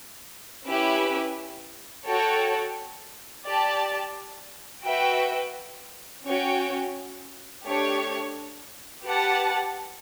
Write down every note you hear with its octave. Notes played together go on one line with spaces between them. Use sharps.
C#4 E4 G4 B4 E5
F#4 A4 C#5 G5
G4 D5 A5
F#4 B4 E5 G5
C#4 F#4 C#5 G5
A3 D4 G4 C#5
G4 B4 F#5 A5